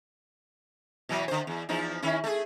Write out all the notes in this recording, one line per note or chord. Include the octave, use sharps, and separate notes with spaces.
B2 E3 F#3
D3 C5
E2
E2 F3 D#4
D#3 C#4 E4
A3 G#4